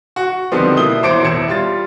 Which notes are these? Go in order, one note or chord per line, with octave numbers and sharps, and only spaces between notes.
F#4
D3 D#3 F3 G3 B3 C4
B2 A#3 E4 D#6 G7
A1 C5 D6 C#7 D7
E1 E2 E4 G#6 C#7 E7
G3 F4 A6